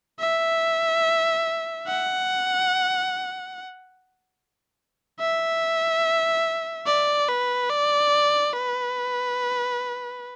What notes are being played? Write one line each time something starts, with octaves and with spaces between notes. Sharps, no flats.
E5
F#5
E5
D5
B4
D5
B4